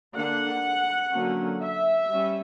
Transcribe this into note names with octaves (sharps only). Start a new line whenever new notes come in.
D3 A#3 D4 F#5
D3 F#3 A#3 C#4
E5
G3 C#4